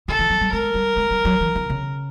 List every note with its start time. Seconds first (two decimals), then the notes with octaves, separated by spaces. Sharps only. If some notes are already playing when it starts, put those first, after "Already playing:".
0.08 D3 A4
0.19 E3
0.30 F#3
0.41 G3
0.52 G#3 A#4
0.74 G3
0.96 G#3
1.11 G3
1.25 F#3
1.40 E3
1.55 D#3
1.70 C#3